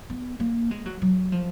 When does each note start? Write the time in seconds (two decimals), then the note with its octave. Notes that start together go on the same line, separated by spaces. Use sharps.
0.10 B3
0.40 A#3
0.71 G#3
0.86 F#3
1.02 F#3
1.32 F3